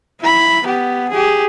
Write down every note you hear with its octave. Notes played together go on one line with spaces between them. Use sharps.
E4 B5
B3 G4
G4 G#4